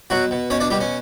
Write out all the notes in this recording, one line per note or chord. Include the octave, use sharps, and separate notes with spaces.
B2 F#3 F#4
B2
B2 C#4 C#5
D4 D5
B2 G3 G4
C#4